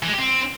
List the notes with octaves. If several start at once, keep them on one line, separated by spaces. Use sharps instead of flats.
E3
G#3
G4
C4